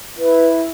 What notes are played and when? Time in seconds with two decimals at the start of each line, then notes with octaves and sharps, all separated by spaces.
0.18 E4 B4